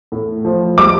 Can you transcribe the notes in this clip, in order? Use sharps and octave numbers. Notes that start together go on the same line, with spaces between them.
A2
F3
G3 D6